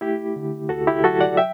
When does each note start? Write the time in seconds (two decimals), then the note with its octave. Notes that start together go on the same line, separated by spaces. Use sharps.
0.01 A3 E4 G4
0.36 D3
0.69 D2 F#4 A4
0.87 E4 G4
1.04 F#3 F#4 A4
1.20 D5 F#5
1.37 E5 G5